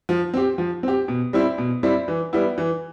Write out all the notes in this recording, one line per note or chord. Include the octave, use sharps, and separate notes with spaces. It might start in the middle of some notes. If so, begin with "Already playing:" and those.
F3
C4 G4
F3
C4 G4
B2
G3 C4 E4
B2
G3 C4 E4
E3
G3 B3 E4
E3